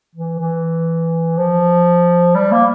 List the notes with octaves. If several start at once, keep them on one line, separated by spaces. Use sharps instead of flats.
E3
E3
F3
G3
A#3